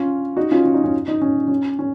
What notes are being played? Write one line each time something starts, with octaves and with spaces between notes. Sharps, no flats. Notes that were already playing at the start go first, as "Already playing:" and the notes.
Already playing: C#4 F4
D#4 F#4
C#4 F4
C#4
D#4
C#4
D#4
C#4
C#4
C#4